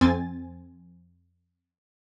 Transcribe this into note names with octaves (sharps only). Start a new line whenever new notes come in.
F2 C4 G#5 A6